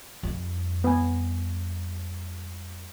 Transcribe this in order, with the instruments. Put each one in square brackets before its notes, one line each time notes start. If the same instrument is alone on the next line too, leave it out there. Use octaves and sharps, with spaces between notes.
[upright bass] F2 G3
[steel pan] B3 G#5